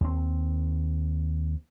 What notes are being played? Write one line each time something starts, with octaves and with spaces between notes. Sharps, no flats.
D#2 C4